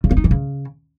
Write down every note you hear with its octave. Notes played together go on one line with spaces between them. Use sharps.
C#3
A#3
D#4
E3
C#3